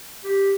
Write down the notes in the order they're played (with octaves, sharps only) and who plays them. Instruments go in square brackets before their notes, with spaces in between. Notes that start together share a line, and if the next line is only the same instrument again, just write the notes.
[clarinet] G4